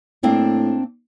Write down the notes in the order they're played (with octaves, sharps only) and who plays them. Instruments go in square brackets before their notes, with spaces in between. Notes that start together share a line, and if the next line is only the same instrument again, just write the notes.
[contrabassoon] A2 [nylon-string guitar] A#3 C4 D4